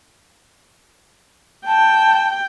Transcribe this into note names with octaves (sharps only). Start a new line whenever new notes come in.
G5 A5